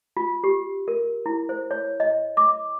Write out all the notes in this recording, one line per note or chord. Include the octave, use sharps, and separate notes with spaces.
F4
G4
A#4
E4
C5
C#5
D#5
D6